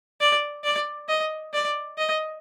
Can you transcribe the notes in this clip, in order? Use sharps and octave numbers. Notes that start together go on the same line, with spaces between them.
D5
D5
D#5
D5
D#5